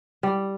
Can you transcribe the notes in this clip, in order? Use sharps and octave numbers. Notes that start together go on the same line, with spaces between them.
G3